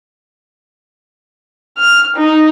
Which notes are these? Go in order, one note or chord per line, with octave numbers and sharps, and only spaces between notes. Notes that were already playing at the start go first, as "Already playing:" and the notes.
F6
D#4